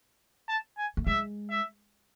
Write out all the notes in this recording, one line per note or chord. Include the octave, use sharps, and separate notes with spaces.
A5
G#5
A3
G#3 E5
E5